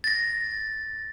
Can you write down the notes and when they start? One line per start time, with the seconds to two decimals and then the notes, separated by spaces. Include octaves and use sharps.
0.04 A6 A#6